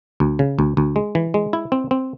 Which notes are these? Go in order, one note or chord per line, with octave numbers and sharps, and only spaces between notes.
D2
C#3
D2
D2
G#3
E3
G#3
E4
C4
C4